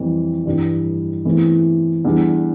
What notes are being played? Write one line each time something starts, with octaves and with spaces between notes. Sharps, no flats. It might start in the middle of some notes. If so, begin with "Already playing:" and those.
Already playing: F2 E3 G3 C4
G2 E3 G3 D4
E2 E3 A3 C4 E4
E2 E3 G3 D4